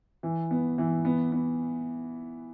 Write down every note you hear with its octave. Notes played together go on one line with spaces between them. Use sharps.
E3
B3
E3
B3
B3